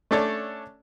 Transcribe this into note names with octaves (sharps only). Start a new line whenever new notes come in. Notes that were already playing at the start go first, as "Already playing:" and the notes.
A3 C#4 D4 A4 C#5 D5